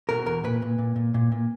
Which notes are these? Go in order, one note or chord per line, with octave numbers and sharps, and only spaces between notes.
B2 A#4
E2 A#4
A#2 B4
A#2
A#2
A#2
A#2
A#2